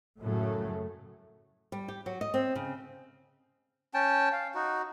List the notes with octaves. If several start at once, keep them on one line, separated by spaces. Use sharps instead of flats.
F#2 A2 C#3 F#3 A3
G3
G4
F#3
D#5
C4
C#3
C#4 G5 A5
F5
D#4 F#4